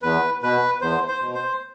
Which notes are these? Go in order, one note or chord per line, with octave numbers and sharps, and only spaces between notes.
E2 B4
B2 B4
E2 C5
C5
B2
C5